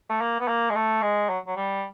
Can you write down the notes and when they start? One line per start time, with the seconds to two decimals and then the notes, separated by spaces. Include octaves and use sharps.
0.09 A3
0.21 A#3
0.40 B3
0.48 A#3
0.70 G#3
0.75 A3
1.02 G#3
1.29 F#3
1.47 F#3
1.56 G3